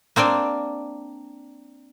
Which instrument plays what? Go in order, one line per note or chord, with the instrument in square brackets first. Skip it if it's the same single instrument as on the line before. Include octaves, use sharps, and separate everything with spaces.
[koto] A#3 C4 D4 D5